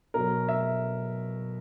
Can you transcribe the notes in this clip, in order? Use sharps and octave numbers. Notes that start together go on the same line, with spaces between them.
B2 F#3 A#4
E5